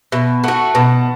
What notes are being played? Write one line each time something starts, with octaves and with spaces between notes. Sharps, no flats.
B2 E5
A3 F#4 F#5
B2 A5